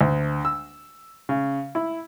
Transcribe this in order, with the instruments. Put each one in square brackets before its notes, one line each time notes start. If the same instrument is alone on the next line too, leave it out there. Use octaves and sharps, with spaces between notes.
[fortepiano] D2
E6
C#3
E4